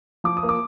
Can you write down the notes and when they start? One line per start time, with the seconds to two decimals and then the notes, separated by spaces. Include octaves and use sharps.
0.24 F3 D6
0.37 D#6
0.43 A#3
0.49 D6